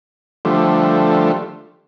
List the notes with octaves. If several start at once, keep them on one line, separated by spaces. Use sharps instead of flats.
D3 F3 G3 A3